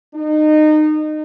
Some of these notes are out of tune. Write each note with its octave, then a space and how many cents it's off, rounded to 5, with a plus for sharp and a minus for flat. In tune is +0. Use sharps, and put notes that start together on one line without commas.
D#4 -25